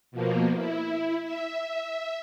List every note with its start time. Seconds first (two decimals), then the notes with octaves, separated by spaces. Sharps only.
0.11 B2 F3 A#3
0.54 E4
1.22 E5